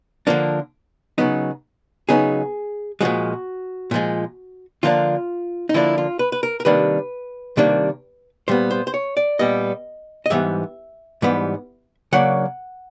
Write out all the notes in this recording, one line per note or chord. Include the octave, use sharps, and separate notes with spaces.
D3 F3 A#3 D4
C#3 F#3 B3 D#4
C#3 F#3 B3 D#4 G#4
A#2 F3 G#3 F#4
A#2 F3 G#3
D3 F3 A#3 D4 F4
D#4
D3 F3 A#3 D4 E4
F4
B4
B4
A#4
A#4
C3 D#3 G3 A#3 D4 B4
C3 D#3 G3 A#3 D4
A#2 G3 B3 C5
C5
C5
C#5
D5
A#2 G3 B3 D#5
D#5
G#2 E3 G3 B3 E5
G#2 E3 G3 B3
C#3 F#3 A#3 D4 F#5